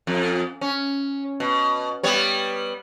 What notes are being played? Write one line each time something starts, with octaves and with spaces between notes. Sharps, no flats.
F2
C#4
B2
G3 B3 C#5